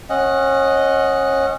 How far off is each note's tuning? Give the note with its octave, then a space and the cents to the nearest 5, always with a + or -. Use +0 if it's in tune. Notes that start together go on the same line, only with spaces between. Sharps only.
C#4 -30 D#5 +0 F#5 -5